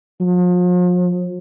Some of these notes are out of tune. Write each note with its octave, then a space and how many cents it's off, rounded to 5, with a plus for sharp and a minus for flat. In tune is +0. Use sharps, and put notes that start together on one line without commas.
F3 +40